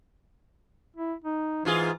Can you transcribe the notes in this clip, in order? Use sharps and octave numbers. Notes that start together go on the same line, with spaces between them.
E4
D#4
G#2 E3 F4 G#4